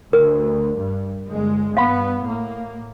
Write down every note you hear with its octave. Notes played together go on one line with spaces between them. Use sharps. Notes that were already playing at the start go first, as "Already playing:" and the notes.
D2 A#4
G2
G1 G#3
G2 B3 F5 F#5 B5
A2 A#3